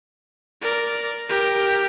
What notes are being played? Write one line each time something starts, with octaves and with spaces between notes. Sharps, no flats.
A#4 D5
G4 A#4